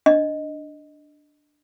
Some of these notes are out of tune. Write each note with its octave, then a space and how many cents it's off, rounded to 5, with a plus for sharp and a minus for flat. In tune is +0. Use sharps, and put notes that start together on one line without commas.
D4 +0 D#5 +0